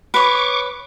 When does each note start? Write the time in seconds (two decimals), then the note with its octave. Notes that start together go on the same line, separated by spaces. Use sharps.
0.14 B4 C#5 C#6 D6